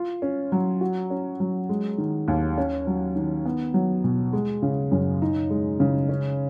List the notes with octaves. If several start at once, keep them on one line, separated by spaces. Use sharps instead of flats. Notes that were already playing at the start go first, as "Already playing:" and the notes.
Already playing: F4
C#4
F#3
F#4
C#4
F#3
G#3
D#3
D#2
C#4
F#3
D#3
B3
F#3
B2
G#3
C#3
F#2
D#4
G#3
C#3
C#4